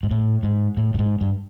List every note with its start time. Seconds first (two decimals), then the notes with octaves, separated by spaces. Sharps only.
0.03 G#2
0.11 A2
0.43 G#2
0.77 A2
0.94 G2
0.99 G#2
1.21 G2